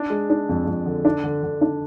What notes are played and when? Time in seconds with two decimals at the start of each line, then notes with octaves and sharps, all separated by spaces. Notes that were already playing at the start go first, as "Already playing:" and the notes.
Already playing: D4
0.10 G#3
0.30 D4
0.49 F2
0.67 F2
0.86 D3
1.05 D4
1.24 D3
1.43 D3
1.61 D4